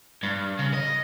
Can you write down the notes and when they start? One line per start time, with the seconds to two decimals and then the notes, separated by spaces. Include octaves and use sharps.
0.23 G2
0.59 C#3
0.74 D#5